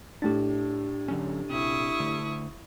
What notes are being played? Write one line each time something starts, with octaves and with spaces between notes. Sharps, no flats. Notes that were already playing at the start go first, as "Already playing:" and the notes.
A2 D4 G4 A6
D3 F#3 C#4
A#1 C3 E4 C#6 D#6
D3 A3